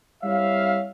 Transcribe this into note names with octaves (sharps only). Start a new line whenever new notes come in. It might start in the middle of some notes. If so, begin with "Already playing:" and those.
G3 C4 E4 C#5 E5 F5